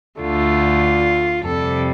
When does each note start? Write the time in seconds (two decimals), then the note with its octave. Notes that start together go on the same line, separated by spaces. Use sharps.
0.20 D2 D3 A3 F4
1.44 F2 C3 G3 A4